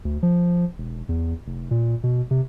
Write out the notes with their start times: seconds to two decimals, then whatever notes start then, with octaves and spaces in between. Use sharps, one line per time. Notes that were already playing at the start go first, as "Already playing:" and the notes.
0.05 D2
0.23 F3
0.78 E1
1.09 E2
1.47 F1
1.71 A#2
2.03 B2
2.31 C3